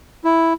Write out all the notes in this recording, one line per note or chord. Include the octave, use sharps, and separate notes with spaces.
E4